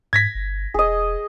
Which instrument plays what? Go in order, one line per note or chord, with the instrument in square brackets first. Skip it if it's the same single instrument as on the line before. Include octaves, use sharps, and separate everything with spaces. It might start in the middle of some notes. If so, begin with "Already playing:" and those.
[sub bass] G#2 [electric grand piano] G#6 A#6 B6
[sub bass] G1
[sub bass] E1 [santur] G#4 D#5